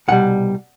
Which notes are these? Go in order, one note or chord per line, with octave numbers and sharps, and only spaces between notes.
C2 B2 G3 F#5